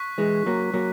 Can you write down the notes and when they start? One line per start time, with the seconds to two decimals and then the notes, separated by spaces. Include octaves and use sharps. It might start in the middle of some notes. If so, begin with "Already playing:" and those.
Already playing: C#6 F#6 B6
0.18 E3 G#3
0.46 F#3 A#3
0.74 F#3 A#3